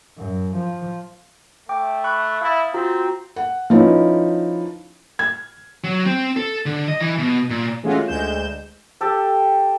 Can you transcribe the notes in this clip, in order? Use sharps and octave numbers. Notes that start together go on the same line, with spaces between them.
F#2
F3
A3 G5 D6
B5 C#6 F#6
E4 F5 D#6 A6
C4 F4 F#4 A#5
F#5
F3 C#4 D#4 E4 B4
G#6
F#3
C4
A4
D3
D#5
E3
B2
A#2
E3 G#3 A3 C#4 F4 F#4
D2 G#3 G6 E7
G4 A4 G5 A5